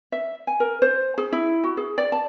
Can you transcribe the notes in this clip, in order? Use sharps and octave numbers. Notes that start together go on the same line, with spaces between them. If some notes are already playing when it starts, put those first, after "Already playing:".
E5
G#5
A#4
C5
G#4
E4
F#4
G#4
D5
A5